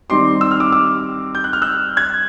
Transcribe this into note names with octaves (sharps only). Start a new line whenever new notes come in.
D#3 G3 C4 D#4 C6 D6
E6
F6
D6 E6
D6 E6
G6
F#6
F6
E6 F#6
F#6 G#6